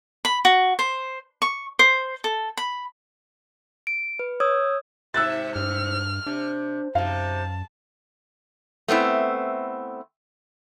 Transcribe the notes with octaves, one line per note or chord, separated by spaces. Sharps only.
B5
F#4
C5
C#6
C5
A4
B5
D7
B4
C#5 D#6 E6 G#6
G#2 C3 E5 E6 F#6 A6
G2 F6
C3 D4
F#2 C3 D#4 F5 A5
A3 B3 C4 E4